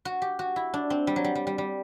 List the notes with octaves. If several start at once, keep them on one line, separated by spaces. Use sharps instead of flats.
F#4
G4
F#4
E4
D4
C4
G3
F#3
G3
G3
G3
G3